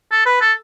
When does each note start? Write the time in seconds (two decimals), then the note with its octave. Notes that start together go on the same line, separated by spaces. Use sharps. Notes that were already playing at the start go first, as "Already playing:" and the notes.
0.11 A4
0.26 B4
0.41 A4